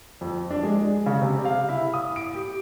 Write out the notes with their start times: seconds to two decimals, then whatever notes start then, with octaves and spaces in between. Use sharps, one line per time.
0.21 F2
0.51 D4
0.63 G#3
1.06 C#3
1.21 C3
1.45 F5
1.68 E4
1.94 D#6
2.16 D7
2.35 G4